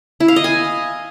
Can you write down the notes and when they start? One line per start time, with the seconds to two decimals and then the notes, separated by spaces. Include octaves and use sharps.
0.20 E4
0.28 F5
0.36 D#5
0.44 G#5